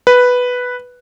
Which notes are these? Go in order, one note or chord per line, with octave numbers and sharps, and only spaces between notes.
B4